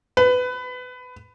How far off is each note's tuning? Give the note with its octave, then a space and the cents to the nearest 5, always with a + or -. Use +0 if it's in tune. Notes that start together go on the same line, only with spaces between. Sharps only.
B4 +20